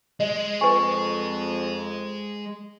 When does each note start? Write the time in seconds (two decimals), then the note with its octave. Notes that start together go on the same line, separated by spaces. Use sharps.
0.20 G#3 D#5
0.61 F2 B4 D#5 G#5 C#6